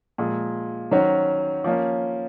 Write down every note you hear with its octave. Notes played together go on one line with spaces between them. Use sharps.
A#2 F3 G#3
D#3 F#3 C#4 F#4 C5
F3 A#3 C#4